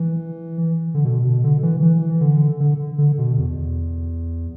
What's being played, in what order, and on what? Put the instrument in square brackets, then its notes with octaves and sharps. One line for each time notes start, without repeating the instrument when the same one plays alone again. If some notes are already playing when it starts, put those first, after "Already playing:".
Already playing: [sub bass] E3
D3
B2
B2
D3
E3
E3
D3
D3
D3
B2
E2